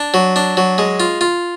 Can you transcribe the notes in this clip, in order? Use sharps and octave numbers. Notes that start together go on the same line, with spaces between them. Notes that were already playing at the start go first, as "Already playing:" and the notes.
Already playing: D4
F#3
D4
F#3
G#3
F4
F4